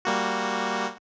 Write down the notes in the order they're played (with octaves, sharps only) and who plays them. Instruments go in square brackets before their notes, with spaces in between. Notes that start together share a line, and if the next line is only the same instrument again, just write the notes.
[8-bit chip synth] G3 A#3 F#4